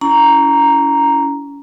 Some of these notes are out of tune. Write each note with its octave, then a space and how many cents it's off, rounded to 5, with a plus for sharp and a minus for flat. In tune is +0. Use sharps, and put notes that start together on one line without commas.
C#4 +35 E4 +5 A#5 +0